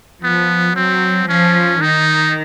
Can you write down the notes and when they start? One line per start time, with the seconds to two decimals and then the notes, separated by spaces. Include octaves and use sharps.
0.23 F3 B3
0.76 F#3 C4
1.28 F3 C#4
1.81 D#3 D#4